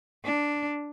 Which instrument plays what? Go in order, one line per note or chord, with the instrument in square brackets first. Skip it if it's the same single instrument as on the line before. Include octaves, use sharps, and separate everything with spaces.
[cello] D4